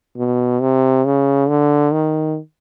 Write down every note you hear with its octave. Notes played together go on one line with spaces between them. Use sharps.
B2
C3
C#3
D3
D#3